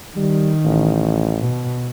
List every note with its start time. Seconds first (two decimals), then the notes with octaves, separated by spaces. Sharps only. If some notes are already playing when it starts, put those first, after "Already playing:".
0.16 D#3 G3
0.65 A1
1.40 B2